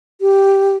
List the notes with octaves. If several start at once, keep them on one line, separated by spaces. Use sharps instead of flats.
G4